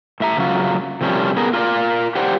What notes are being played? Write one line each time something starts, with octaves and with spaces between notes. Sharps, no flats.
A2 E5 A#5
C#3 F#3 F4
C3 F3 G3 A3 C#4 A#4
B3 G#4 A#4
F4 A#4 D5
G4 C5 D5 F#5